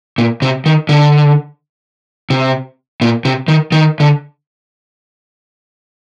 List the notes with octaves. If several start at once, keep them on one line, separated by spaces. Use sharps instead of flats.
A#2
C3
D#3
D3
C3
A#2
C3
D#3
D#3
D3